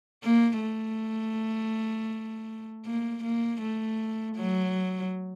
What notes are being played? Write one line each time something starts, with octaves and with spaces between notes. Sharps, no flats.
A#3
A3
A#3
A#3
A3
F#3